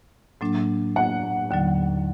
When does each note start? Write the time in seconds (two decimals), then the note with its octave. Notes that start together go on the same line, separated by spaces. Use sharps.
0.41 A2 F#3 A#3 D4
0.96 F#5
1.51 D#2 D3 F#3